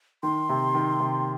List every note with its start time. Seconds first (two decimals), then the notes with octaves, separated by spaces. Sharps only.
0.23 D#3 C6
0.49 C3
0.75 D#3
1.00 C3